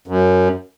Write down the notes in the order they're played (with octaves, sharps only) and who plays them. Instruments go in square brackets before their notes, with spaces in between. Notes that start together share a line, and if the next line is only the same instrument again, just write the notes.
[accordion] F#2